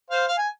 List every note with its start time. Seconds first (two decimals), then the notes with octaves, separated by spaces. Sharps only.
0.10 C5 F5
0.28 F5
0.38 G#5